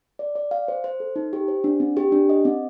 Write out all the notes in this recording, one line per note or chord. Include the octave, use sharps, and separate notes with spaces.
D5
D5
F5
C5
C5
A4
D#4
G4
C5
D4
C4
G4
D4
D#5
C4